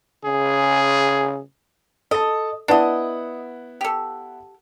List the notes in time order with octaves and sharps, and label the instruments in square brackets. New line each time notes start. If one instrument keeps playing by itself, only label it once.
[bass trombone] C#3 [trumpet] G#4
[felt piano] A4 A5 [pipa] D#5
[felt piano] B3 E4 F#5 [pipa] D4 D#5
[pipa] G4 A4